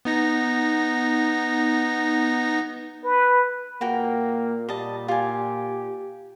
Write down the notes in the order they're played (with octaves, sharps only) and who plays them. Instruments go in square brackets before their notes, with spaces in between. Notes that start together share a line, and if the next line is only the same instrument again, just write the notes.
[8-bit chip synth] B3 D#4 A#6
[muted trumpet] B4
[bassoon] A#2 [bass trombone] A#3 [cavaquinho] F#4 A#4 G5
[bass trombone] A#2 [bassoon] G3 [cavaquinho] D#5 A5
[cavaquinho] F4 G#5 [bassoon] G4